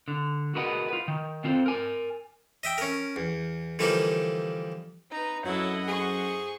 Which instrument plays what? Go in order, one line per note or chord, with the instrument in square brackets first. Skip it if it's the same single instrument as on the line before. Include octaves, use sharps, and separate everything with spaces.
[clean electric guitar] D3
F#4 G#4 A#4 B4 D#5 F#5
F4 B4
D#3
B3 C4 F4 G#4 A4 C5
A#4 G#5
[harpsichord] D#5 E5 G5
C#4 A#4
E2
D3 E3 F3 G3 A#3 D#4
[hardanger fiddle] D#4 [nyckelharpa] B4 A#5
[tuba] F#2 [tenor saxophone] F#3 [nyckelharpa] E4 A4 [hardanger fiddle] D#5 F#5
[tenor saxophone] G#4 [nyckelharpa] C5 C#6